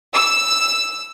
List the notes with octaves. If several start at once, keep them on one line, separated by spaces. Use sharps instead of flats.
E6